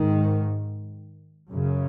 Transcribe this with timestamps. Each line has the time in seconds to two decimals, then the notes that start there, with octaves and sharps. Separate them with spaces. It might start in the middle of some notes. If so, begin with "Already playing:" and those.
Already playing: G#2 D#3
1.49 F#2 C#3